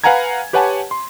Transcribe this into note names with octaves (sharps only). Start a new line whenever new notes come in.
B4 F5 F#5 G#5 A#5 G#6
G4 B4 C#5 F#5 G#5 A5
C6